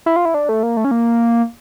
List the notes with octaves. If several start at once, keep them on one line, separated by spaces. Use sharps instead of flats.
E4
F4
E4
D4
A3
A#3
A3
C#4
A#3